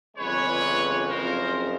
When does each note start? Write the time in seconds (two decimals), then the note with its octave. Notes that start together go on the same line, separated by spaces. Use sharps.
0.16 G1 F2 C#3 E3 G#3 B4 C#5
1.07 F#1 F2 C#3 A#4 C5